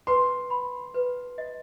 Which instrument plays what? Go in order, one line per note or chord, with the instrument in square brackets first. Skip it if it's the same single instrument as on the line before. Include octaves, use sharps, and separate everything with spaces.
[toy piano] B4 [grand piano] C6
[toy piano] B5
B4
D#5